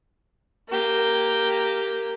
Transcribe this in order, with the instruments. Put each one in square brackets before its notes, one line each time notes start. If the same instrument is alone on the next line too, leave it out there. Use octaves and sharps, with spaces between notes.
[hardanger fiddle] A#3 G4